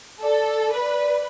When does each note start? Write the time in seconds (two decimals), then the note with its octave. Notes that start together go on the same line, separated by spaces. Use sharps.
0.22 A4 D5
0.72 B4